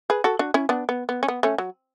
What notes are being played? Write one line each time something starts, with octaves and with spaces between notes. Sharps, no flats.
G#4 B4
F#4 A4
D4 F#4
C#4 E4
B3 D4
B3
B3
C#4
B3
A3 C#4
F#3